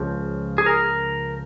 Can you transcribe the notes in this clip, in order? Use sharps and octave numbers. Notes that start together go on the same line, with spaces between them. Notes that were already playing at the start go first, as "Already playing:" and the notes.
Already playing: C#2 C#3 F3
G#4
A#4